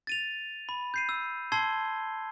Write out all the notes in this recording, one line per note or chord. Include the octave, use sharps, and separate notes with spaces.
A6 D#7 F7
B5
G6 C7 D#7
E6
A5 C6 E6 G#6 C7 G7